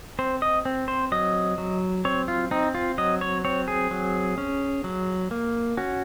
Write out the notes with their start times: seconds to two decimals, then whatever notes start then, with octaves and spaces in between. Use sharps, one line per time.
0.19 C4 C5
0.42 D#5
0.65 C4
0.88 C5
1.12 F#3 D#5
1.58 F#3
2.05 C4 C#5
2.28 F4
2.51 C4 D#4
2.75 F4
2.98 F#3 D#5
3.21 C#5
3.45 C4 C#5
3.68 G#4
3.91 F#3
4.38 C#4
4.84 F#3
5.31 A#3
5.77 C#4 F#4